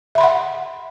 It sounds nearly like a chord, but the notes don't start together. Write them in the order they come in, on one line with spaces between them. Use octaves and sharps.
E5 B5 C6 F#5